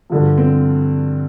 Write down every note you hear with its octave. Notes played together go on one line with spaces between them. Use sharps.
G2 D3 F3
C4